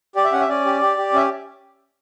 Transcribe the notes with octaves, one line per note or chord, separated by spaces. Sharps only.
G4 D5
E5
C#4 F#5
E5
C#4 D5
G4
G4
G4
C#4 E5